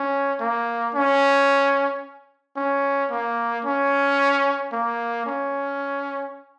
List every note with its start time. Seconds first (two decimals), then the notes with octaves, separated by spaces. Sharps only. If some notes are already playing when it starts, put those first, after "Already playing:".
Already playing: C#4
0.40 A#3
0.94 C#4
2.56 C#4
3.11 A#3
3.65 C#4
4.72 A#3
5.26 C#4